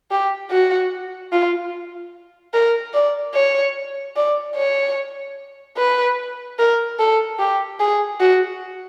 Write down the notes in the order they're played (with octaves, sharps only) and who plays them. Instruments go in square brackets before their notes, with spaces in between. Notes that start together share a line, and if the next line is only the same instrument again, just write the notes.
[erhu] G4
F#4
F4
A#4
D5
C#5
D5
C#5
B4
A#4
A4
G4
G#4
F#4